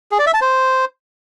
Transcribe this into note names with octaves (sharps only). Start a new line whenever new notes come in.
G#4
D5
E5
A5
C5